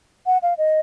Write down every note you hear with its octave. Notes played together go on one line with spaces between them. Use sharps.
F#5
F5
D#5